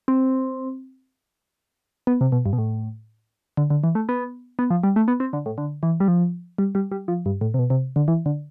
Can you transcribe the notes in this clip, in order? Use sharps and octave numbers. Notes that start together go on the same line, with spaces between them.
C4
B3
C3
B2
G2
B2
A2
D3
D3
E3
A3
B3
B3
F3
G3
A3
B3
C4
D3
A2
D3
E3
G3
F3
G3
G3
G3
F3
G2
A2
C3
B2
C3
D3
E3
D3